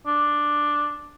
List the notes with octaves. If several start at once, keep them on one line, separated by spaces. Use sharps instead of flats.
D4